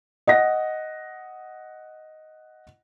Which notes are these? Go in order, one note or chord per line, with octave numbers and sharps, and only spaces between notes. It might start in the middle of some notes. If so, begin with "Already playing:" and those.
D#5 F#5 A#6